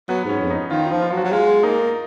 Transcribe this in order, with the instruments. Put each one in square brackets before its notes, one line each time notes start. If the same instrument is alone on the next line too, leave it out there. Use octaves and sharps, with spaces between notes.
[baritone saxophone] F#3 [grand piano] B3
[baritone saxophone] G#2 [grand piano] C#4
[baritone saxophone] F2
[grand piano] D#4
[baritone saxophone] D#3 [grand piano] F4
[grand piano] F4
[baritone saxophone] F3
[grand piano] F4
[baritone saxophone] F#3
[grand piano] F#4
[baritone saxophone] F#3
[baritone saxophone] G#3 [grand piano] F4
[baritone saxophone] A#3 [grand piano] D#4